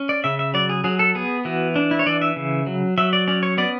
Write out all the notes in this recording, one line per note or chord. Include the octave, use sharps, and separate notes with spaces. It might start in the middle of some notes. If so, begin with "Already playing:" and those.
Already playing: C#4
D5
C#3 E5
E5
F#3 D5
G#4
F#3 G#4
A4
B3 G#4
E3 F#4
D4
E4
C#5
E3 D5
E5
C#3
F#3
F#3 E5
D5
C#4 D5
C#5
B3 D5